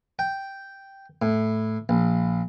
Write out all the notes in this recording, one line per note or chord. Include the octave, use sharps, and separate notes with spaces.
G5
A2
A#1